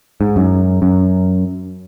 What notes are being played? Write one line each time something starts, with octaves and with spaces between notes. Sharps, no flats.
G#2
F#2
F#2